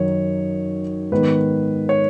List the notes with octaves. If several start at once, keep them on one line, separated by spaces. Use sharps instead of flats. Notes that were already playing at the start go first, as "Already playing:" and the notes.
Already playing: F#2 D#3 F#3 D#4 C#5
G#2 D#3 B3 D#4 B4
C#5